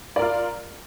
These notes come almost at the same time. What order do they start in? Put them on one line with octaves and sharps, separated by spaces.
D5 A#4 F4